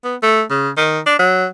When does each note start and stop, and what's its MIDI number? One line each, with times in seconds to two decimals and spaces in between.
0.04 0.16 59
0.22 0.43 57
0.50 0.69 49
0.77 0.99 51
1.06 1.17 62
1.19 1.47 54